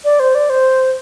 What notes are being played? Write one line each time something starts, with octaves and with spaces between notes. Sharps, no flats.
D5
C5
D5
C5